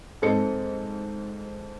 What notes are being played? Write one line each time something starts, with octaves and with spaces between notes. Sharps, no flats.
G#2 C4 A4 D#5 C#7